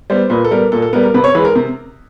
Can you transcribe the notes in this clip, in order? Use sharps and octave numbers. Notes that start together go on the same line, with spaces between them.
G3 B3 C5
A#2 B4
A4
G3 B3 A#4
A#2 A4
A4
G3 B3 A#4
A#4
C3 B4
C#5
E3 G#3 B4
A#4
C3